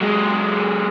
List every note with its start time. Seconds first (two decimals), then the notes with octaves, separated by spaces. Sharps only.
0.01 F#3 G#3